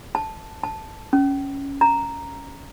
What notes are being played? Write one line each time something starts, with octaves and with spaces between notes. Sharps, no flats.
A5
A5
C#4
A#5